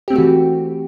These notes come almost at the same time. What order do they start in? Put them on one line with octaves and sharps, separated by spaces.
G4 C4 A3 F#4 E3